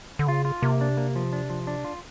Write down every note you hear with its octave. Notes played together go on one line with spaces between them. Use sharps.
D3
C#3 F4
F4
C3 A#3
D4
A#3
F3
D4
F3
D4
F4